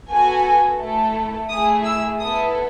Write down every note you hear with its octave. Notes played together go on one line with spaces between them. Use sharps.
B3 F#4 A4 G#5
A3 E4 A4
A3 E4 G#4 D#6
E6
B3 E4 A4 D#6